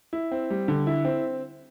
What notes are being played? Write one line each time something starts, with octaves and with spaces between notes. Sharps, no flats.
E4
C4
G3
D3
E4
C4